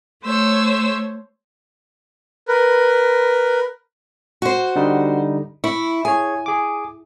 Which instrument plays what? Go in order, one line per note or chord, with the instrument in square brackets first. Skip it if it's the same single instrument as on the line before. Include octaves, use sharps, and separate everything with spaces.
[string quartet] A3 C5 C#5 E6
[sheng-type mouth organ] A#4 B4
[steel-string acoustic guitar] F#4 C5
[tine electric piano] D3 G3 D#4
[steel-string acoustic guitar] E4 [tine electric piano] B5 C#6
[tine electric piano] G#4 C#5 [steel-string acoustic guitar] G#5
[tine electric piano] G#4 D6